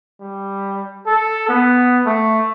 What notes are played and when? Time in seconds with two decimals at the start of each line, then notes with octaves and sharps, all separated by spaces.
0.21 G3
1.07 A4
1.49 B3
2.06 A3